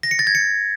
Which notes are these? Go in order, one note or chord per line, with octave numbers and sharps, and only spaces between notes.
A#6
C#7
A6
G#6
C#7